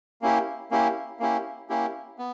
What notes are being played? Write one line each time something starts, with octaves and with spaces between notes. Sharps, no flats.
A#3 C#4 E4 G4
A#3 C#4 E4 G4
A#3 C#4 E4 G4
A#3 C#4 E4 G4
B3